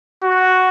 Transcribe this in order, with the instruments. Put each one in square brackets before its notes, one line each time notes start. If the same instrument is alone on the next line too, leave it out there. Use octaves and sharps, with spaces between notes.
[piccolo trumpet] F#4